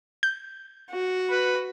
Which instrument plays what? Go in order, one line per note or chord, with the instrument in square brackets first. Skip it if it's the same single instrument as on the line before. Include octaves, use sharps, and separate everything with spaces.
[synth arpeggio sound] G6
[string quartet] F#4
[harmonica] B4 B5